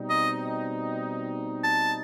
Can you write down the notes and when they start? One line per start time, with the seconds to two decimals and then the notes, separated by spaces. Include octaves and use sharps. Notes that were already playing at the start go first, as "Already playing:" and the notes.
Already playing: B2 G3 C4 D#4
0.10 D#5
1.64 A5